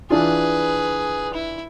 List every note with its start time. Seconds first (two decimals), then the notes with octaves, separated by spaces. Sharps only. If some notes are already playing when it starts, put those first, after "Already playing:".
0.10 E3 D4 F4 G#4 B4
1.34 E4